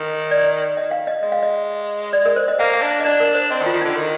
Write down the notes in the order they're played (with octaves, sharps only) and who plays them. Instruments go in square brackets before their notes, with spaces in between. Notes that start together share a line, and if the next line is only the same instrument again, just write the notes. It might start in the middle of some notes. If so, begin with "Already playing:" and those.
Already playing: [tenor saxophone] D#3 [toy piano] D#5
[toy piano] D5
D#5
F5
D#5
[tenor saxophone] G#3 [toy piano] D#5
[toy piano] F5
D#5
D5
A#4
C5
D#5
[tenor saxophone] A#3 [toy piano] F5
[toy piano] F5
[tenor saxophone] D4
[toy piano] D#5
[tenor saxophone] D4 [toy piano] D5
[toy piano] A#4
C5
[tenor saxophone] C4 [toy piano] D#5
[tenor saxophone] D#3
[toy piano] F4
[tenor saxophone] D#3
[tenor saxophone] D3 [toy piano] D#4
[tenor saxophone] D#3